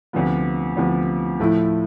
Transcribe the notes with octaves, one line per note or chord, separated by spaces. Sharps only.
D2 C3 F3 B3
D2 C3 F3 B3
A2 F3 A3 E4